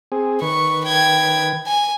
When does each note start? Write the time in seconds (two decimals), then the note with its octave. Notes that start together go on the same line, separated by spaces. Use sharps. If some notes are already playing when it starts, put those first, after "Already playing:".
0.12 C4 G#4
0.42 D#3 B4 C#6
0.85 G5 G#6
1.67 G#5